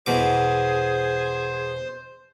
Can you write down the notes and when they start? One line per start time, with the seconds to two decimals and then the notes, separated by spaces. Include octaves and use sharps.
0.06 E2 B2 G#4 C5 D6